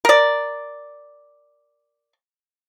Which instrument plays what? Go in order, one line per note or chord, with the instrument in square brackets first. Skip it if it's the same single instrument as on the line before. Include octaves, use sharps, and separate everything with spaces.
[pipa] A#4 D5